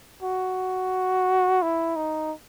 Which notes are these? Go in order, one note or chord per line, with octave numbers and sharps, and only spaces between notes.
F#4
E4
D#4